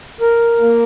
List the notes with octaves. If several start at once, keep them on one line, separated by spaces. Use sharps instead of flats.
A#4
A#3